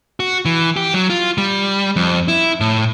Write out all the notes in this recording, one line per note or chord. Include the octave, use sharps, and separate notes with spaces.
F#4
E3
G4
F#3
F4
G3
F2
E4
A2